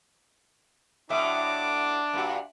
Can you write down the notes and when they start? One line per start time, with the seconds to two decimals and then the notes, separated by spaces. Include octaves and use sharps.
1.10 A2 F#3 D4 E5 D6
2.13 G2 A#2 F#4